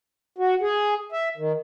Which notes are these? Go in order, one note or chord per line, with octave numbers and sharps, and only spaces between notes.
F#4
G#4
E5
D#3